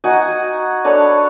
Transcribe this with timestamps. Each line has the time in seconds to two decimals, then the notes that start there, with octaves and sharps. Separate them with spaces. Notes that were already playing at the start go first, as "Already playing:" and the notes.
0.04 D#4 F#4 F#5 G#5
0.84 D4 A4 B4 C#5